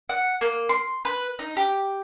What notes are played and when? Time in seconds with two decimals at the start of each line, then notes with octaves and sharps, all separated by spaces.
0.09 F#5
0.41 A#3
0.69 C6
1.05 B4
1.39 D#4
1.57 G4